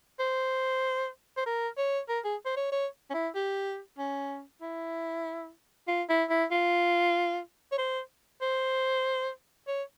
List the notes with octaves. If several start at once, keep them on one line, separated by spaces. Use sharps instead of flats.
C5
C5
A#4
C#5
A#4
G#4
C5
C#5
C#5
C#4
E4
G4
C#4
E4
F4
E4
E4
F4
C#5
C5
C5
C#5